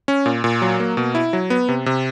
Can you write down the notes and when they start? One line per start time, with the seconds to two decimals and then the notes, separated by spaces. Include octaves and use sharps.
0.08 C#4
0.26 A#2
0.44 A#2
0.62 F#3
0.80 A#3
0.97 B2
1.15 E4
1.33 F#3
1.50 B3
1.69 C3
1.86 C3